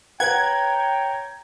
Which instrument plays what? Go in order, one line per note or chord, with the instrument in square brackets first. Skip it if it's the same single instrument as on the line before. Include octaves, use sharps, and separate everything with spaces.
[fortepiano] B4 F#5 [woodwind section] C#5 A#5 [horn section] G5 [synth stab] G#6